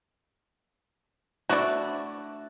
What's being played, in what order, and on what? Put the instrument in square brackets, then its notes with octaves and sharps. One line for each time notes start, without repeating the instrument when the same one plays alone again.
[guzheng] A3 D4 E4 [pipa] F#4 D5